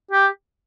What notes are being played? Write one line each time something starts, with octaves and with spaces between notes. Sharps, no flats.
G4